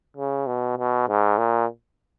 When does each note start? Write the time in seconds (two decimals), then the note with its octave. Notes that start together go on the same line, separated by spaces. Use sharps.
0.17 C#3
0.47 B2
0.77 B2
1.08 G#2
1.38 A#2